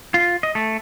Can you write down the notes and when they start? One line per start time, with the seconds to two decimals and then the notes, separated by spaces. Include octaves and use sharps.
0.14 F4
0.43 D#5
0.55 A3